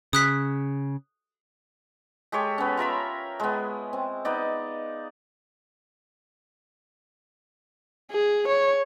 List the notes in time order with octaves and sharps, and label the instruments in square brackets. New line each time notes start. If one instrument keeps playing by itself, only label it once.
[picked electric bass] C#3 [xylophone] D#6 F#6 B6
[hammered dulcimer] G#3 G4 A4 C#5
B3 C#4
F4 A#4 E5 B5
G#3 B3
C4
B3 D#4 D5
[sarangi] G#4
C#5